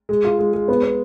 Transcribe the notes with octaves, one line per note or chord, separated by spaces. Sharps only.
G#3
F4
G#3
G#3
B3
B3